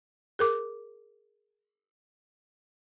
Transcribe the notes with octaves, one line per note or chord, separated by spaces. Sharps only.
G#4 A#4 D6